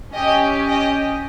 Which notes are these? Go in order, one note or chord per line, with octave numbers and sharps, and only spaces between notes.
C#4 G4 D#5
D#5